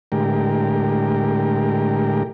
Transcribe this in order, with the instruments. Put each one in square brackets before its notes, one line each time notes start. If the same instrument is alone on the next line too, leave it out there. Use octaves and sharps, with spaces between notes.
[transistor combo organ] A2 D3 G#3 G4 A#4